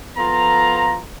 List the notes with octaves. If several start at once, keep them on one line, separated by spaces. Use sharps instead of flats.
F3 B3 F4 A4 A#5